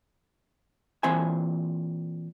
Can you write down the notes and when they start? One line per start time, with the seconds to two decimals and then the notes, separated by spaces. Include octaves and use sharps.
1.03 A#2 E3 C4 C5 E5 G#5